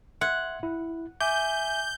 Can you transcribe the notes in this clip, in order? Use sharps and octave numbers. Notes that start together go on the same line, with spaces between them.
E5 F#5 C6 G#6
E4
E5 G#5 D6 G6